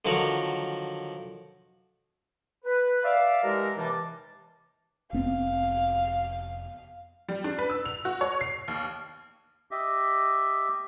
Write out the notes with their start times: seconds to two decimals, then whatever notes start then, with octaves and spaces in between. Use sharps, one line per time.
0.05 D3 D#3 F3 F#3 F#4 A#4
2.65 B4
3.04 D5 E5 F5
3.44 E3 G#3 G4 A4 A#4
3.77 D#2 C3 E3 G3 A5 D6
5.13 F1 B3 C4 F5
7.29 G3
7.44 D4
7.59 B4
7.70 E6
7.86 F7
8.05 F#4
8.21 C#5
8.41 C7
8.68 D#2
9.71 G4 D#5 E5